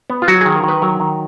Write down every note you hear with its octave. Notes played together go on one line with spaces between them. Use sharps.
B3
F4
F#3 F#4
D#3 G#4
A#4
D#3 B4
F#3 A#4
D#3